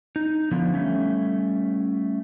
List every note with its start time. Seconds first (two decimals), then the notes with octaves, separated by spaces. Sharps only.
0.16 D#4
0.51 D3 F3 B3
0.74 G3 A3 C#4